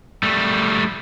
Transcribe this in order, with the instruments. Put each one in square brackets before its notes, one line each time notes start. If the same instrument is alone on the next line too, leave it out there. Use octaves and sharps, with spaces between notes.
[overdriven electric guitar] G3 A3